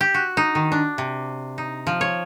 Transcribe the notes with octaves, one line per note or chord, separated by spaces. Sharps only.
G4
F#4
D#4
D#3
D4
C3
D#4
F3
C#5